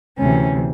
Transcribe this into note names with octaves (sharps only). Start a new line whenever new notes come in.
D2 C3 E3 C#4